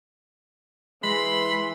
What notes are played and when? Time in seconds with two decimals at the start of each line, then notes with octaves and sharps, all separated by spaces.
1.04 E3 G#3 B5 C6